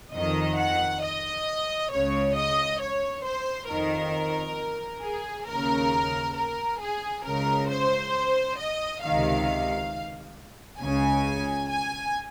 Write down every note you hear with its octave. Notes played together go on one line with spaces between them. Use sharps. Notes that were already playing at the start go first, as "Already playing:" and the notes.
F2 D#3 D#5
F#5
D#5
C#2 C#3 C#5
D#5
C#5
C5
F2 D#3 A#4
G#4
D#2 C#3 A#4
A#4
G#4
C#2 C#3 A#4
C5
D#5
C#2 C3 D#3 F5
C#2 C#3 G#5
G#5